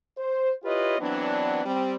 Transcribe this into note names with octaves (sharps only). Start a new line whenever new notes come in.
C5
E4 F4 G4 B4 C#5 D#5
E3 F#3 B3 C4 D4
G3 C4